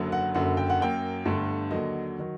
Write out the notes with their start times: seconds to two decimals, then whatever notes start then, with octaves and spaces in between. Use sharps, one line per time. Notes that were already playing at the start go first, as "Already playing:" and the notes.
Already playing: F#1 F#2 D3 F#3
0.12 F#5
0.35 F#1 F#2 D3 F#5
0.57 G5
0.70 F#5
0.80 F#2 F#3 A#3 G5
1.25 G1 G2 D3 A3
1.71 D#2 D3 F#3 D#5
2.19 D#3 F#3